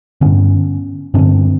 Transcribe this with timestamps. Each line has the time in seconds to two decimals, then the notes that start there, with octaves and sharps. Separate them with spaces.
0.21 G2 D3 B3 C#4
1.14 G2 D3 C4 D4